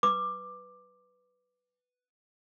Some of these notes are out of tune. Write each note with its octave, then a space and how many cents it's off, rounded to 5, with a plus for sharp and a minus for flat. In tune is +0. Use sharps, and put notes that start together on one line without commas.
B4 +5 D6 +10